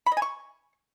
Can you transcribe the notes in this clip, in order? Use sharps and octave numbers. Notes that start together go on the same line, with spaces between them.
B5
D#5
G#5
C#6